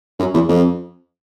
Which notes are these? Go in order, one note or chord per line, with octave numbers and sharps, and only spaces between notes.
F#2
E2
F2